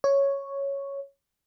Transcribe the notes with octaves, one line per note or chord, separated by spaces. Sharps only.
C#5